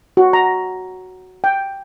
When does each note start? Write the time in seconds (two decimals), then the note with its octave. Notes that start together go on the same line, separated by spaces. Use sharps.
0.17 F#4
0.33 A#5
1.44 G5